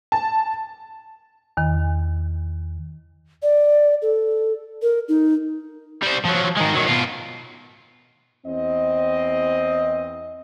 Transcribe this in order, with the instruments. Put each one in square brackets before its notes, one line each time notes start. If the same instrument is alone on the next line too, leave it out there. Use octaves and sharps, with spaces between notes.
[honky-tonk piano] A5
[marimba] E2 D#3
[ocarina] D5
A4
A#4
D#4
[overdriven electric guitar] G3 C5
F3 F#3
D#3 G#3
D#3 F#3
B2 F4
[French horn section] E2 C4 D#5